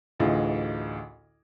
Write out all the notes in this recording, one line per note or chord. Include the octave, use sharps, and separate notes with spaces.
A1 D2 F4 G#4 D#5